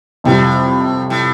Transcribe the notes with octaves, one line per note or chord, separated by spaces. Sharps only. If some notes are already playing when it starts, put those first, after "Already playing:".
F2 A2 C3 G3
A2